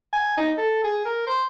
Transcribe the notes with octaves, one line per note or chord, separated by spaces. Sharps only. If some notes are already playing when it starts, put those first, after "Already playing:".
G#5
D#4
A4
G#4
A#4
C5